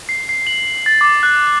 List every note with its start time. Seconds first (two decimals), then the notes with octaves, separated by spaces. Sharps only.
0.09 C7
0.29 C7
0.47 F#7
0.86 A6
1.01 D6
1.23 F#6